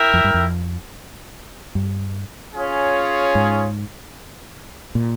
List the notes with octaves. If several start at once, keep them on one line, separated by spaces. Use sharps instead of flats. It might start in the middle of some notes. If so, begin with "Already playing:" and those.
Already playing: E4 A#4 E5 G5
F2
G2
F2
G2
C#4 F4 G#4 C#5
G#2
A#2